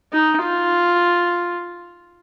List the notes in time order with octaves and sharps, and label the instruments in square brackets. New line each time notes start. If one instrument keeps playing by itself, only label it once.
[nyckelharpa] D#4
F4